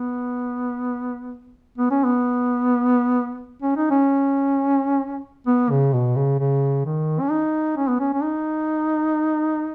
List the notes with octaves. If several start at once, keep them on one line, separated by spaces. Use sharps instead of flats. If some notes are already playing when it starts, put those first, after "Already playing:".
Already playing: B3
B3
C#4
B3
C#4
D#4
C#4
B3
C#3
B2
C#3
C#3
D#3
C#4
D#4
C#4
B3
C#4
C#4
D#4